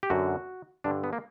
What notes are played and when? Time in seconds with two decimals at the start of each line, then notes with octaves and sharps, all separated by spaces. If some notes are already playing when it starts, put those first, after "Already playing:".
0.03 G4
0.10 F#2 D3 F#4
0.84 G2 D3 D4
1.04 B3
1.13 A#3